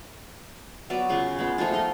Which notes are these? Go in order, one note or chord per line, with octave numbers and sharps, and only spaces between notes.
F#3 B3 B4 D5
C#3 F4 B4
G#3 B3
F3 A3 D#4 F4
A#4 D#5